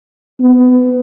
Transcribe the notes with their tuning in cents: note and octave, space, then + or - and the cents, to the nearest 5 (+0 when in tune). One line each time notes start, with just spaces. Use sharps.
B3 +25